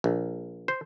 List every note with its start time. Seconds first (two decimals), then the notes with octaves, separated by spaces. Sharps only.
0.04 A#1
0.68 C5